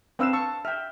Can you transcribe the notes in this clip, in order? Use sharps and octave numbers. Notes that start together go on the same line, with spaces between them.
C4 D4 B4 F5 E6 E7
A5 C#6 E6
E5 G5 F6